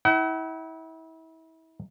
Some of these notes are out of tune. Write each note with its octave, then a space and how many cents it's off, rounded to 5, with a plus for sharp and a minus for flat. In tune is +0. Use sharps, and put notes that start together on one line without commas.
E4 -35 F#5 +40